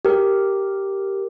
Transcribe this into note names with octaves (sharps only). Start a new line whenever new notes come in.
G4 A#4